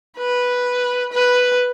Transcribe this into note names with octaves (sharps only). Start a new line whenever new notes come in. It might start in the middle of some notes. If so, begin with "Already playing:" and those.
B4
B4